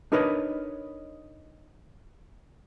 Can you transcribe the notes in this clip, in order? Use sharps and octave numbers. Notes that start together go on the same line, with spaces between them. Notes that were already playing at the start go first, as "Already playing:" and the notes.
D4 D#4 A#4 B4 C#5 D#5